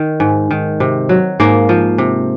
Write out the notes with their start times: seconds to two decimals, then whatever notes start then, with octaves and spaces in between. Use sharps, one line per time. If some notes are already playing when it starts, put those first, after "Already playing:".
Already playing: D#3
0.20 G#2
0.51 D#3
0.80 C3
1.09 F#3
1.40 G#2 A#3
1.69 F3
1.98 C3